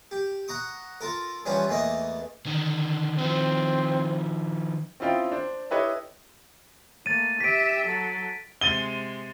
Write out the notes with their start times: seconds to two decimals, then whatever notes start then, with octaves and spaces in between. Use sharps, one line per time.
0.11 G4
0.48 F#5 A#5 C#6 D#6
1.01 F4 A4 A#4
1.46 E3 F3 G3 B3 C#4 F4
1.68 E2 E3 A3 A#3 D#5
2.46 D3 D#3
3.18 D#3 F3 C4
5.00 C4 C#4 E4 F4 D#5 G5
5.32 D4 C5
5.71 E4 G4 A4 B4 C#5 D#5
7.06 A3 A#3 A6 D#7
7.40 G4 E5 B6 D7
7.86 F#3 A4
8.61 C3 G#3 A6 D#7 G7